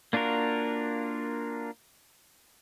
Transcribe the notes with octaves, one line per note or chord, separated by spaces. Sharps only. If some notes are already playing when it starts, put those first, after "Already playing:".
A#3 D4 F4 F#4 A#4